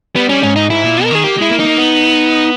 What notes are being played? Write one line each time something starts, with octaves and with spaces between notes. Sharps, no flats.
G3 B3
G3 C#4
G#2 C#4
G#2 D#4
G#2 E4
A#2
B2
A#4
D#3 G#4
A#3 G4
G#3 E4
A#3
D#4
A#3
B3